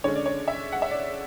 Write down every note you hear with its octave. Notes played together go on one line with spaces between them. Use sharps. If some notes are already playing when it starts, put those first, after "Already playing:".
D3 G#3 C#4 C#5
D5
C#5
E5
F#5
E5
D5